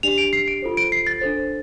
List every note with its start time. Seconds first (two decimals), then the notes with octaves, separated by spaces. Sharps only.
0.03 D4 G4 D5 F7
0.18 D7
0.33 C7
0.48 D7
0.62 F4 A4 C5
0.77 D7
0.92 C7
1.07 A6
1.22 D4 A4 C5